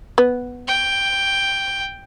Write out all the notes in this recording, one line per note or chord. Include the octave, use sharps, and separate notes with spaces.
B3
G5